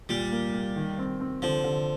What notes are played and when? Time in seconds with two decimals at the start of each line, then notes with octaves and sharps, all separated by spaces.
0.09 A#2 G3
0.32 A#3
0.53 A#3
0.76 D#3
0.98 C4
1.20 C4
1.42 D3 F3
1.64 D3